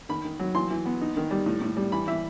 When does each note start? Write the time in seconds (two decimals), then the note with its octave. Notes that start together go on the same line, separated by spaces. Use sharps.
0.09 D#3 B5
0.25 D#3
0.40 F#3
0.55 E3 C6
0.70 E3
0.86 B3
1.01 D#4
1.17 D#3
1.31 G3
1.46 A2
1.62 A2
1.77 G3
1.92 E3 B5
2.07 E3 E5